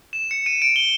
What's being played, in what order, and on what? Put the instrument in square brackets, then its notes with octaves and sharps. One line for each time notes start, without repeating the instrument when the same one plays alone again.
[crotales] E7
C#7
D#7
D7
G7